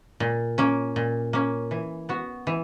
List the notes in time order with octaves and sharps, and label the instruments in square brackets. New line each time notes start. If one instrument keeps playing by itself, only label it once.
[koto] A#2
A#3 C#4
A#2
A#3 C#4
E3
B3 F#4
E3